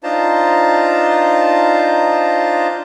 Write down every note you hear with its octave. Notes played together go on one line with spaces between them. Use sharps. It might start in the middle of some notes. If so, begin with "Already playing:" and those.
D4 D#4 F4 C5 A5 A#5